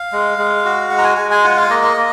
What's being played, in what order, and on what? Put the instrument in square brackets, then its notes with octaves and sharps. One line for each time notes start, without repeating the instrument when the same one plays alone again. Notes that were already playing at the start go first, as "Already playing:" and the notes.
Already playing: [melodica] F5
G#3
G#3
F#4
G#3 F#5
A#5
G#5
G#3 G#5
G#5
F4 F#5
F5
A#3 D#5
D#5
A#3